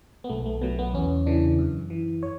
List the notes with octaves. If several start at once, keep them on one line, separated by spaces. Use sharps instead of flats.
B3
B1 A3
A3
B2 F#3 B3
B3
E2 C#4
C#3 E3 D4
F#2
E3
C#5